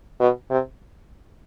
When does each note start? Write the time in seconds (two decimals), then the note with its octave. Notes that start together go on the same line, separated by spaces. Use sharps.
0.20 B2
0.50 C3